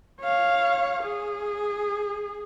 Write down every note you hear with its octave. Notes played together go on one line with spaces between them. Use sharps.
C#5 F5
G#4